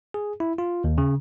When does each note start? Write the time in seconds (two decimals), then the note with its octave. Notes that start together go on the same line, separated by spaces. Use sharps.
0.14 G#4
0.40 E4
0.58 F4
0.84 D#2
0.98 C#3